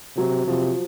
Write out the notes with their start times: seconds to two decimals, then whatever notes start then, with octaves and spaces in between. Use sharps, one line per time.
0.16 C3 F#3
0.47 C3 F3